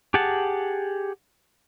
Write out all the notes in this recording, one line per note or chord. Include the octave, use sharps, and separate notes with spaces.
G4 G#4 F#5 A5